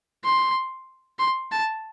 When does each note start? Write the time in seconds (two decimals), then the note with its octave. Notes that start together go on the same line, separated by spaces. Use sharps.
0.24 C6
1.19 C6
1.52 A5